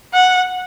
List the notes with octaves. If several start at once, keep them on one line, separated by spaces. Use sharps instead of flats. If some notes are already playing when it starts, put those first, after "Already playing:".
F#5